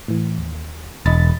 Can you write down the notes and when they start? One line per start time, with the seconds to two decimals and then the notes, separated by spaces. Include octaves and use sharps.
0.08 A2 E3
0.38 D#2
1.06 E1 D#5 B5 A6